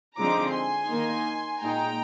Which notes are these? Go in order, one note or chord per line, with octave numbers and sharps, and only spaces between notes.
D3 F3 G#3 C4 D#4 A#5 D6
G#5 C6
D#3 A#3 D#4
A#2 G#3 D#4 G5 A#5